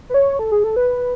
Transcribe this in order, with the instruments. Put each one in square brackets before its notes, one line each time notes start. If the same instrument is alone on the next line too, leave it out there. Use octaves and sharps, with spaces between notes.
[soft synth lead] B4
C#5
A4
G#4
A4
B4